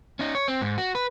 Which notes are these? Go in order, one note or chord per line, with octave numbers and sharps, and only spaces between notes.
C#4 D#4
C#5
C4
G#2
F#4
B4